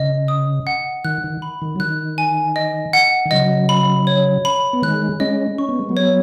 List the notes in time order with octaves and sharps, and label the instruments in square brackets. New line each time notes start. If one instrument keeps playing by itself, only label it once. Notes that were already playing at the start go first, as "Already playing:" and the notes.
Already playing: [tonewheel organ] C#3 [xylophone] D#5
[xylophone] D#6
F#5
[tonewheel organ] D#3 [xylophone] F#6
[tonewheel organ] D#3
[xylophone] B5
[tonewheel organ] D#3
F#3
[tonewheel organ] D#3 [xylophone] F#6
[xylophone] G#5
D#5
F#5
[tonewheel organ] D#3
[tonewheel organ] C#3 F#3 [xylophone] D#5
[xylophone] B5
C#5
B5
[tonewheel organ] B3
[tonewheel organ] D#3 G#3 [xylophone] F#6
[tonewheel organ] G#3 C#4 [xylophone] D#5
[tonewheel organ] C#4 [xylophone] C#6
[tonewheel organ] B3
G#3
F#3 B3
[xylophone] C#5